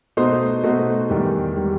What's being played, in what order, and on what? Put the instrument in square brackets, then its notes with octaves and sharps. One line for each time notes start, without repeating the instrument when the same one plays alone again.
[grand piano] B2 A3 D#4 F#4 C5
B2 A3 D#4 F#4 C5
E2 D#3 G3
D#3 G3